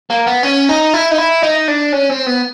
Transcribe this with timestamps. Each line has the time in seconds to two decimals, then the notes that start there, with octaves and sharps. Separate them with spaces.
0.10 A#3
0.27 B3
0.43 C#4
0.69 D#4
0.94 E4
1.11 D#4
1.18 E4
1.43 D#4
1.68 D4
1.93 C#4
2.10 C4
2.26 B3